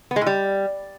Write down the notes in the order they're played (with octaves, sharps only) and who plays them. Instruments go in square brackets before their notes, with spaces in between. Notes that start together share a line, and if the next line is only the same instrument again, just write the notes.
[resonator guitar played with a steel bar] B3
G#3
A2
G3